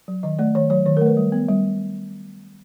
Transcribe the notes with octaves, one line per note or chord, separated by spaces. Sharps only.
F#3
D#3 D#5
A3 D5
D#3 C#5
F#3 C#5
D#3 C#5
A#4
A3
B4
G3
B3
G3